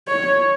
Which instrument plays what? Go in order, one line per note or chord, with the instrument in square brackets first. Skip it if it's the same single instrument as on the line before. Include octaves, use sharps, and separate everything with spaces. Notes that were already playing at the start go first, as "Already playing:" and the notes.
[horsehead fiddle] C#5